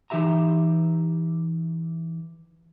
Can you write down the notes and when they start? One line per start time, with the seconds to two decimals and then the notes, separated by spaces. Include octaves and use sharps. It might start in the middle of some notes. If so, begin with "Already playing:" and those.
0.10 E3 D#4 G4 E5 A#5